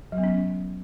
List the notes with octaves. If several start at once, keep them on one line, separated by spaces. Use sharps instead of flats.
F#3
B3
C#4